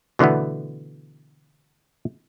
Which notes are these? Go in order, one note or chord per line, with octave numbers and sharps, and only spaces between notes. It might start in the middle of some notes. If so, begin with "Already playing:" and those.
B2 D3 E3 A3 B3